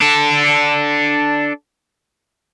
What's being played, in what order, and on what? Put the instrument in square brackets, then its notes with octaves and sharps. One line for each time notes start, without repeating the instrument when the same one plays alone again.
[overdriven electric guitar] D4 A4